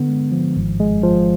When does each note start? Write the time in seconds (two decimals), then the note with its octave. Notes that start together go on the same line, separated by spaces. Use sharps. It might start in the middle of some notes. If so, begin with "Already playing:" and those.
Already playing: D3 B3
0.08 G#3
0.32 F3
0.56 G#1
0.80 G#3
1.03 F3